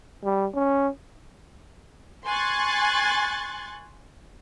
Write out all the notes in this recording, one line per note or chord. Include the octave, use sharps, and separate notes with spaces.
G3
C#4
G#5 C6 C#6 F#6 G#6 A6